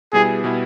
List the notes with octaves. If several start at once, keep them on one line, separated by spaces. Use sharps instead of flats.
B2 G3 B3 E4 G#4
B2 G3 B3 E4